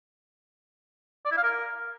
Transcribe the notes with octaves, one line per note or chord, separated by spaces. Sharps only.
D5
E4
F5
A#4